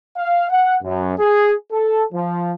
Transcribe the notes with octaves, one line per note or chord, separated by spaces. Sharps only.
F5
F#5
F#2
G#4
A4
F3